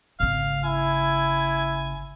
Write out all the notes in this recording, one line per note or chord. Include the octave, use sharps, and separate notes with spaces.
G#1 C#3 F5
E4 G#5